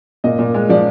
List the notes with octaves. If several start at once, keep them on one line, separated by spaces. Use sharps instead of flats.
A#2 D#5
A#2
G#3
F3 D5